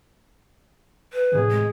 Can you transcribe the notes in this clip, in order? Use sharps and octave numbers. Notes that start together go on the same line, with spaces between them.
B4
A1 C3 G#4 G#6
G#3